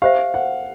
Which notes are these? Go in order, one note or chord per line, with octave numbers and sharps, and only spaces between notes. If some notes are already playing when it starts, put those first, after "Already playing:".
G4 C5 E5 F5
F#5